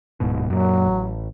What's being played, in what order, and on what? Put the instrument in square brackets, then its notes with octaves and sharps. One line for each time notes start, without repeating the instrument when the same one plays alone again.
[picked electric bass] D1 G#2 B2
[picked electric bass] F#2 A#2 [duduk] F#3
[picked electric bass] A1